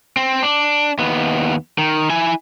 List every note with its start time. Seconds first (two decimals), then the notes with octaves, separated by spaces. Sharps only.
0.17 C4
0.43 D4
0.99 D#2 B3
1.78 D#3
2.10 E4 G#5